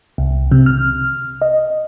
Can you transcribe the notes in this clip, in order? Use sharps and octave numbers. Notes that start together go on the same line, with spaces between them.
C2
C3
F6
D#5